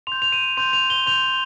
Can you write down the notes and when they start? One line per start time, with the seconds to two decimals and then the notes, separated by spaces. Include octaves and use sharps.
0.07 C6 G6 F7
0.22 F7
0.32 D#7
0.57 C6 G6 F7
0.73 F7
0.90 G7
1.06 C6 G6 F7